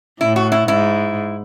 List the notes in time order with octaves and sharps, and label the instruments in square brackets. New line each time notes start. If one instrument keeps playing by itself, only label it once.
[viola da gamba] A2 [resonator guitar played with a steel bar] E4
[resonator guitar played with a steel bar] F#4
E4
[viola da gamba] G#2 [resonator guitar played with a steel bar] E4